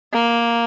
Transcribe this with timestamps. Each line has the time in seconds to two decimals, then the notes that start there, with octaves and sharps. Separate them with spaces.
0.13 A#3